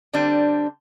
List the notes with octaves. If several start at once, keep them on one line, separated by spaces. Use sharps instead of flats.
D3 G3 C4 D4